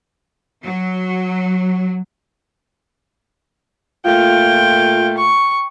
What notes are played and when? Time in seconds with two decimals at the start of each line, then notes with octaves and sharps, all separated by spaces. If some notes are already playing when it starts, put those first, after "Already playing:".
0.63 F#3
4.05 A#2 A3 F4 G5
5.18 C#6